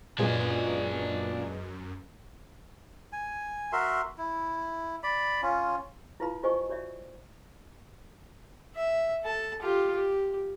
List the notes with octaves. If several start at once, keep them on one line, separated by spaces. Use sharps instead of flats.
F#2 A#2 F#3 G#3 B3 D4 G#5
G#5
F#4 A#4 E5 C6
E4
D5 B5
C#4 F4
E4 F4 B4 F5 A5 B5
F4 G4 C5 D#5 G#5 C#6
F#4 C#5 D5 E5
E5
A4 A5
F4 G4
G4